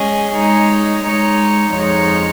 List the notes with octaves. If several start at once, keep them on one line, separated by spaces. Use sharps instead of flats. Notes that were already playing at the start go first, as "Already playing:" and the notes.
Already playing: G#3 C#4 G#4 D#5
G#3 D#4 C#5
G#3 D#4 C#5
F2 F3 G#3 D#4 C#5